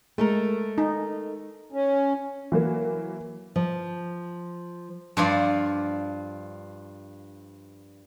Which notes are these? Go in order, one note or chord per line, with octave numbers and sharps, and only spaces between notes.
G#3 A3 A4 A#4
D#4
C#4
E3 F#3 A#3
F3
G2 F3 F4 D5